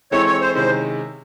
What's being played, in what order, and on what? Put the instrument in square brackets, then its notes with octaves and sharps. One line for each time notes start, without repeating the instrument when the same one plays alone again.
[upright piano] E3 G#3 C4 E4 A4 [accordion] C#5
[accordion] C#5
C5
[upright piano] C3 D#3 G#3 C#4 E4 [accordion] C5